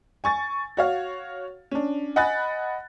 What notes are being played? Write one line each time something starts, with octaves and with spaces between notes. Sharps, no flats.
G#5 C#6 A6
F#4 C#5 F5
C#4 D4
D#5 F#5 G#5 B5 F#6 A6